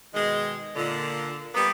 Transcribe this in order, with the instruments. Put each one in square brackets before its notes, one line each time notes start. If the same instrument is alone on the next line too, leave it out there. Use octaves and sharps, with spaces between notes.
[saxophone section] B2 D#3 G#3
A#2 D3
G3 A#3 B3